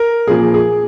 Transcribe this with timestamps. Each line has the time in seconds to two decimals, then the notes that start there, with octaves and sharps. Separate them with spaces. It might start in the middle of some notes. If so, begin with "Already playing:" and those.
Already playing: A#4
0.27 A#2 F3 A#3 G#4
0.54 G#4